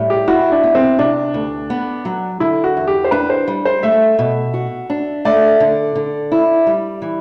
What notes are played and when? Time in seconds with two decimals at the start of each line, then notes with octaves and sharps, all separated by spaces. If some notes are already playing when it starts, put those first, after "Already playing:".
Already playing: A2 G3
0.10 G4
0.28 E4 F#4
0.52 D4
0.63 B3
0.75 C4
0.99 C3 D4
1.34 D2
1.70 B3
2.05 F#3
2.40 D3 E4
2.64 F#4
2.77 E2
2.87 G4
3.04 C5
3.11 D4 B4
3.30 C5
3.48 G3
3.65 C5
3.83 A3 E5
4.19 B2
4.54 F#4
4.90 D4
5.25 A3 D5
5.60 D3
5.95 D3
6.32 E4
6.67 G3
7.02 E3